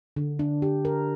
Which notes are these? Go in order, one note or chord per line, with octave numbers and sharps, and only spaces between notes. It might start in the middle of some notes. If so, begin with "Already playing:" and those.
D3
D4
G4
A#4